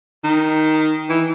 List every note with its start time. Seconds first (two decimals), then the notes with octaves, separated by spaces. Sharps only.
0.24 D#3
1.09 E3